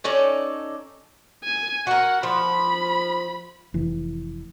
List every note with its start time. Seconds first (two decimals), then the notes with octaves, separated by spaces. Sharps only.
0.04 C#4 D#4 A4 D5
1.45 G#5
1.87 F#4 A#4 F#5
2.23 F3 B5
3.74 F1 E3